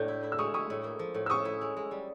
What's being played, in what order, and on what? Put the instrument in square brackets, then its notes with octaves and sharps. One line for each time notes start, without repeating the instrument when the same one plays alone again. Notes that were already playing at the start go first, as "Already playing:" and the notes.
Already playing: [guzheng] A2 A3 D4 [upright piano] G6
[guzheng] E4
E4
[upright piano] E6
[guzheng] G#3 [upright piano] C#6 D#6
[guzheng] E4 [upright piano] C#6 D#6
[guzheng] A2
A#3
F3
A2
[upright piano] E6
[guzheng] C#4 [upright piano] C#6 D#6
[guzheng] E4
G#3
G#3
G3